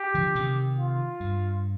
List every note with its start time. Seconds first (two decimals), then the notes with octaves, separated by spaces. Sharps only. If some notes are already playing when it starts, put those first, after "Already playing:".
Already playing: G4
0.14 D3 F3
0.35 C3 D#3
0.77 F4
1.20 G2